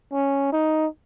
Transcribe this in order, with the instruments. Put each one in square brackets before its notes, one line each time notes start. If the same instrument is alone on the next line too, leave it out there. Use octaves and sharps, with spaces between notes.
[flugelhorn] C#4
D#4